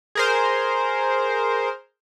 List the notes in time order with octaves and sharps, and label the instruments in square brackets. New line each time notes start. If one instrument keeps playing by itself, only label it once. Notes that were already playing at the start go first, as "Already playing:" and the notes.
[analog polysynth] G#4 A#4 C5